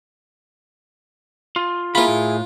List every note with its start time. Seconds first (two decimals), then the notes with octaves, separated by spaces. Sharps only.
1.56 F4
1.95 A#3 E4 F4 G#4 A#4 B5
2.08 A2